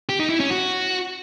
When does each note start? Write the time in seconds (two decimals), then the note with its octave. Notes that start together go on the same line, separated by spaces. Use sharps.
0.09 G4
0.20 D#4
0.30 E4
0.40 C#4
0.50 F#4